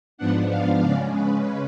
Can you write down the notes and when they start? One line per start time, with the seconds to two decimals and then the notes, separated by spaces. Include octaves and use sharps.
0.18 G#2 F3 B3 D4 F#5
0.51 F5
0.82 C#3 G#3 C#4 D5
1.14 B4